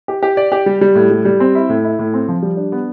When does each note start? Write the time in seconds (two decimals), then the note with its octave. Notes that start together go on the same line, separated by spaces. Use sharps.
0.08 G4
0.23 G4
0.37 D5
0.52 G4
0.66 G3
0.81 G3
0.95 A2
1.11 G3
1.25 G3
1.40 C4
1.55 E4
1.69 A2
1.84 E4
1.99 A2
2.14 C4
2.28 F3
2.42 G3
2.57 D4
2.72 B3